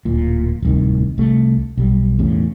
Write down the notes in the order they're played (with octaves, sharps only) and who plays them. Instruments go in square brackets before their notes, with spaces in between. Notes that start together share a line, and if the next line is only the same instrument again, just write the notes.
[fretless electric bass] D1 A#2
D1 C2 D#3
C2 A3
B1 G3
E2 A2 C#3